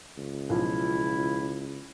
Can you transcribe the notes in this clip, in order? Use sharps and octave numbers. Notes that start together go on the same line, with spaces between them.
C#2
B1 F3 E4